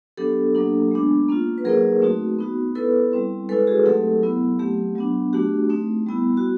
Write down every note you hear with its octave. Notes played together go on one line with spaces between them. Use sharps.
F#3 B3 D4 G4 A4
F#3 A#3 D4
G#3 B3 D4
A#3 C#4 F4
B4
F#3 A#3 D#4 G#4 A#4
A3 C4 D#4 F#4
B3 D#4 F#4
B3 E4 A4 B4
G3 C4 E4
G#3 C#4 E4 A4 B4
F#4 G#4
F#3 A3 C4 D#4 G4 A4
F#3 B3 E4
F#3 A3 C4 G4
F#3 B3 D4
A3 D4 F#4 G4
A3 C4 D#4
G3 B3 E4
F#4